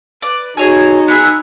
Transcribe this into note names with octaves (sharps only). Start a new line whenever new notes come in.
B4 D5
D#4 F#4 G#4 C#5 G#5
B3 G#4 E5 F#6